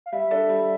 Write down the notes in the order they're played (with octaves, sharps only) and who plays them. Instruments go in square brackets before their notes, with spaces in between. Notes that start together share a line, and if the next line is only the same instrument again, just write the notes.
[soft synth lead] F5
[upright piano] G3 [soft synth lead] E5
[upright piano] D4 A4
G3